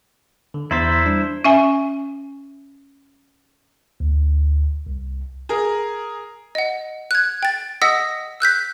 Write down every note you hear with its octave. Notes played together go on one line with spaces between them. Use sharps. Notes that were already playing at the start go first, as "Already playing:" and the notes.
D3
E2 E4 C5 E5 A#5 A6
G3 D4
C#4 E5 G#5
D2
C2
G#4 A#4
D#5 F#5
F#6 G#6
G5 A6
D#5 F#5 D#6 E6 A#6 B6
E6 F#6 G6 B6